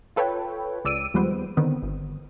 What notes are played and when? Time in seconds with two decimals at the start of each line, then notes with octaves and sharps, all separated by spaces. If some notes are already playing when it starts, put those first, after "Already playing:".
0.16 F4 A4 B4 C#5 G5
0.85 C#2 D5 E6 D7 D#7
1.14 D#2 F3 G3 G#3 B3 C5
1.57 D3 D#3 B3 C4
1.82 G1